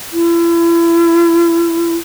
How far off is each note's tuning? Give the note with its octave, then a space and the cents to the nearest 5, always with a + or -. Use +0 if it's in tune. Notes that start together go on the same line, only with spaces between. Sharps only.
E4 +35